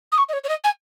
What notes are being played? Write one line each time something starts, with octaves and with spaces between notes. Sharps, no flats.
D#6
C#6
D#5
C#5
C#5
D#5
G#5